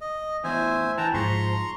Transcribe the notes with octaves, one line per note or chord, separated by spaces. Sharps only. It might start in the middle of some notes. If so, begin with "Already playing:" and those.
D#5
E2 A2 C5 E5 G#5
E3 G5 A5 A#5
G#2 F3 A#5 C6 C#6